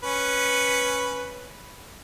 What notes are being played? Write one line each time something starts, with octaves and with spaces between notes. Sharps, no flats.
C#4 B4